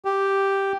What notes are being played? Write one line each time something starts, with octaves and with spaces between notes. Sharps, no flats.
G4